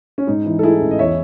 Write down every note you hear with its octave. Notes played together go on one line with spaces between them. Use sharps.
C#4
G#2 D#4
E3
A4
A3 E4 G#4
A1
D#5
E2 C#5 E5